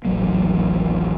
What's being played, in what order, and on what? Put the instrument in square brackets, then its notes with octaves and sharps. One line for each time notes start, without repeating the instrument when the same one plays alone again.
[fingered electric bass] D#1 A1 F#3 A#3